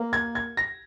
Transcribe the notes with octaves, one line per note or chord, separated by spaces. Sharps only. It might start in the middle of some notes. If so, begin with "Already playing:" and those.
Already playing: A#3
G#6
G#6
A#6